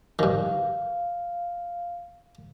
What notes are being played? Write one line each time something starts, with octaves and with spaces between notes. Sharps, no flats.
G2 D#3 F5